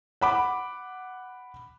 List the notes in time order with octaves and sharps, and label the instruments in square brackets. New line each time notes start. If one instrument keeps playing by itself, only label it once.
[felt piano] F#5 B5 D6